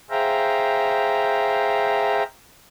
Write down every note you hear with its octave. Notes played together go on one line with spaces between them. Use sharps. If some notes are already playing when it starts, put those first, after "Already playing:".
G#4 C5 E5 F5 G5 A#5